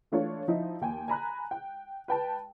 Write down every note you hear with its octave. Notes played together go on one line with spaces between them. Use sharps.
E3 A3 D4 F4 C#5
F3 D#4 E4
D#2 G5 G#5
G#5 A#5 B5 F#6
G5
B4 G5 A5